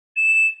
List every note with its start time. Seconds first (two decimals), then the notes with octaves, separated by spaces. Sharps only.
0.16 E7